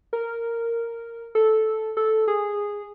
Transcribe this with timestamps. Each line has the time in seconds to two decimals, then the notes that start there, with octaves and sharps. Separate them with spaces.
0.13 A#4
1.35 A4
1.97 A4
2.28 G#4